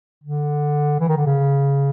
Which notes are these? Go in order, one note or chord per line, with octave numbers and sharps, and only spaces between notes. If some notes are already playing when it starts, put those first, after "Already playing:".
D3
E3
D#3
D3
C#3